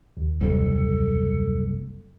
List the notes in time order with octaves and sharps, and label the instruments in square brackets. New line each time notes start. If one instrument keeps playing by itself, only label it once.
[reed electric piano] D#2
[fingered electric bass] F#1 C2 [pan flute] A4